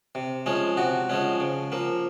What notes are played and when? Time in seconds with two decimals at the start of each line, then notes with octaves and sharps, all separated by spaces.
0.15 C3
0.46 F3 G#3 C#4
0.77 C3 F#4
1.09 F3 G#3 C#4
1.40 C#3
1.72 F3 A#3